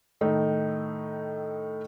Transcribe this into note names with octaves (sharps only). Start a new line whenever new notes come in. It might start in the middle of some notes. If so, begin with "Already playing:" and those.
A2 D#3 A3 D#4